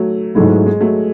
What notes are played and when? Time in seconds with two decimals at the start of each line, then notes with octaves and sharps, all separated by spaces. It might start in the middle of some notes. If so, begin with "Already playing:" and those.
Already playing: F#3 A3
0.35 G#2 F#3 G#3 A3 E4
0.66 G#3
0.81 F#3 A3